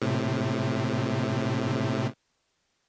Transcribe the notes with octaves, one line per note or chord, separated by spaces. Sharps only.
A2 C3